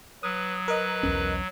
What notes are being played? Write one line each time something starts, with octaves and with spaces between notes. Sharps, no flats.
F#3 B4 D#6
A#4 B4 D#5
B1 E2 C#4